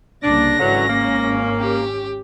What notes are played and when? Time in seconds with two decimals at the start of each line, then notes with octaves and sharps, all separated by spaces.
0.23 C2 C#3 A#3 D4 A#6
0.59 G#1 D3 E3 F#3 C#4
0.89 A#3
1.59 G4